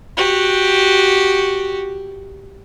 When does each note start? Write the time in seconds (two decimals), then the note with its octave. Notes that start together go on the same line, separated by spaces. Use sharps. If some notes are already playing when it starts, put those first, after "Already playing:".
0.17 F#4 G4